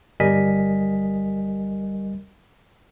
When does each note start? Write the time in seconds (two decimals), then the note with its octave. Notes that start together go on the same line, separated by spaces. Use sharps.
0.20 G1 G3 A#4 D#5 G#5 B6